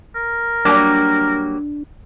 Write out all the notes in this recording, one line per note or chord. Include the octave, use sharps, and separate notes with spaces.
A#4
F#3 G3 A#3 D4